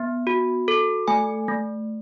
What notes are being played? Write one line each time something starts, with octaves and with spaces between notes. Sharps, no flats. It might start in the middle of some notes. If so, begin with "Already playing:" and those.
Already playing: B3
F#4
A4
A3 G#5
A3